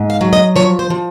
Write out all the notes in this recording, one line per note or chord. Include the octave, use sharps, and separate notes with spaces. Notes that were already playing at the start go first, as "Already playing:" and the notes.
Already playing: G#2
F5
F#3
D#5
F3 C#5
C5
F3